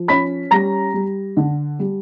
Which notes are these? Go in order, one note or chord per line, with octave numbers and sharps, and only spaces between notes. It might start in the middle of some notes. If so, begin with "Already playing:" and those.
Already playing: F3
C#4 B5 B6
G3 A#5 A#6
G3
D3
G3